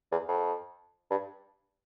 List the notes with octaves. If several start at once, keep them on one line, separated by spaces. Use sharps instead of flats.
E2
F2
G2